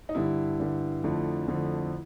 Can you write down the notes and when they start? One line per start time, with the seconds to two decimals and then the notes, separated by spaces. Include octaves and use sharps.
0.09 D#4
0.15 G2 D3 G3 E4
0.59 G2 D3 G3
1.04 F2 D3 F3 A3
1.48 F2 D3 F3 A3